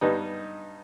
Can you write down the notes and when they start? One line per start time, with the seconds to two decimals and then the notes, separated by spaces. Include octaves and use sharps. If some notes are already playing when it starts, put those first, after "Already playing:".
0.01 G2 G3 B3 D#4